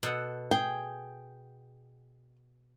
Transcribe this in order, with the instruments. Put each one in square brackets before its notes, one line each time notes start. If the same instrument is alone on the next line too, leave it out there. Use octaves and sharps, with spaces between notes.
[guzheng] B2 A4 F#5
[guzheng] G#4 [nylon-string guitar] G5